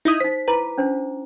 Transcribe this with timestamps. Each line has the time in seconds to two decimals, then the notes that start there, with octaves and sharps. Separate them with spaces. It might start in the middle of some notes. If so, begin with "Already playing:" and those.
0.05 D#4 E4 D#6
0.20 D#4 C5 B6
0.48 E4 B4 A#5 D6
0.78 C#4 D4 C5